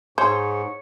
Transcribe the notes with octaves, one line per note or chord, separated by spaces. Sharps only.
G#2 C5 C#5 C#6